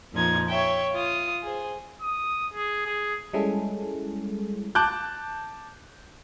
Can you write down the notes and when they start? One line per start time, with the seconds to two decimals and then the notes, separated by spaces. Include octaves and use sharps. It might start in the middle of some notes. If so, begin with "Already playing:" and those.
0.13 F2 A#2 F3 D#4 G#6
0.49 C#5 E5 G5
0.93 F4 D#6
1.44 G#4 C5
2.02 D#6
2.54 G#4
2.86 G#4
3.33 G3 G#3 C#4 E4 G#4 A4
4.75 A5 D6 F#6 G6